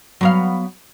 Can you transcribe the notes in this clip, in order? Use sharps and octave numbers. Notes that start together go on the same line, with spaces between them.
F#3 B3 F5